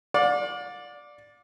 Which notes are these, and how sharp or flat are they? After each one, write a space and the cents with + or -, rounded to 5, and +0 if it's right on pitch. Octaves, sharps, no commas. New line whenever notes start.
D5 +0 F5 +45